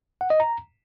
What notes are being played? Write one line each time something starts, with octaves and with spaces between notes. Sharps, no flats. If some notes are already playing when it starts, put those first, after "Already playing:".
F#5
D#5
A#5